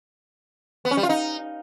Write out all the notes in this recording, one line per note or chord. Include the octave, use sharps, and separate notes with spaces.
B3
C#4
G3
F4
D#4